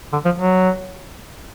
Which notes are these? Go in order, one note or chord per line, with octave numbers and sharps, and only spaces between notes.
D3
F3
F#3